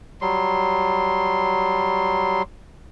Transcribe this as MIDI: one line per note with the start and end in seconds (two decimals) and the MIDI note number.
0.21 2.42 54
0.21 2.42 55
0.21 2.42 84